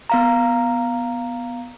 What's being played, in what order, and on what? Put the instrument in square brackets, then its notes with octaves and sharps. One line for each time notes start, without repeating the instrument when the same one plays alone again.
[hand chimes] B3 F5 A#5